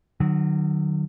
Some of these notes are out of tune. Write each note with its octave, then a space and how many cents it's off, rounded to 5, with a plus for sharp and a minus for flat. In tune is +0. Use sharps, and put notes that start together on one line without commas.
D#3 -45 F#3 +0